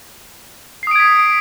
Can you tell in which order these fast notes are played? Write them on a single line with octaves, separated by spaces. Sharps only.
C7 D#6 D7 G#6 B6